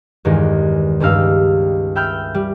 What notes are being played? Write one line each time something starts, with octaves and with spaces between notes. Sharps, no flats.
E2 G2 D#3 E3 G#3
C#2 G2 G3 D#4 F5 E6
E5 G5 B5 F6 G6
G3